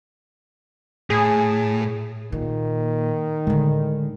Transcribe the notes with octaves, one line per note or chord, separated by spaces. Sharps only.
A2 G#4
A#2 D#3
A2 D3 G#3